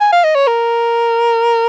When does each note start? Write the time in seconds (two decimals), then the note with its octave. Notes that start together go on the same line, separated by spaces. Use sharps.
0.01 G#5
0.12 F5
0.24 D#5
0.35 C#5
0.47 A#4